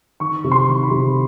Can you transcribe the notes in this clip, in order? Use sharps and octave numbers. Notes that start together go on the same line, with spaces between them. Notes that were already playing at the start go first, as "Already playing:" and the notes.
D#3 C#6
C3
C6
D#3
B5
C3